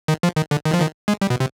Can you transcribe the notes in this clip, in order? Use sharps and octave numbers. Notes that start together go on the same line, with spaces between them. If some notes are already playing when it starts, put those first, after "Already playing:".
D#3
F3
D#3
D3
D#3
F3
D#3
G#3
G3
B2
C3